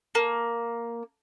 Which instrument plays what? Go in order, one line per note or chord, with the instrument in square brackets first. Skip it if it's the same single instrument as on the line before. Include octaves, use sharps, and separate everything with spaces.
[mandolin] A#3